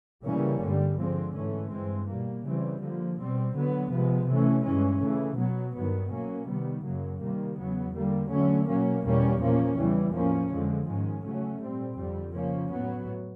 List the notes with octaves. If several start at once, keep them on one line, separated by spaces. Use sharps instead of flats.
C#3 E3 G3 A#3 C#4
G2 D3 G3
D3 F3 G#3 C4
G#2 E3 A3 C#4
G2 E3 G#3 C4
B2 G3 A#3
C#3 E3 G3 C4
D3 F3 A#3
B2 G3 C4
D3 F#3 B3
C3 F3 G#3 B3
C3 E3 A3 C#4
G2 E3 G#3 C#4
C#3 E3 A3
B2 F#3 B3
G2 D#3 F#3 B3
B2 F#3 A#3 C#4
C3 D#3 G3 B3
F#2 C#3 F#3 A#3
C3 D#3 G3 A#3
E2 C#3 F#3 B3
D3 G3 A#3
D3 F#3 A3 C#4
B2 F#3 A#3 C#4
E2 B2 G3 A#3 C#4
A#2 F3 A#3 C#4
E2 C#3 E3 G3
A2 F3 A#3 C#4
F2 D3 F3 G#3
G#2 D#3 G#3 C#4
C#3 F#3 A3 C#4
A#2 G3 C4
F2 D3 G3
C#3 F3 A#3 C#4
A2 F#3 B3